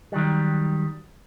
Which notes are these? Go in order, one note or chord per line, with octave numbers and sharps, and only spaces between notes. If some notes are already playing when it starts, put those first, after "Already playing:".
D#3 F#3 G3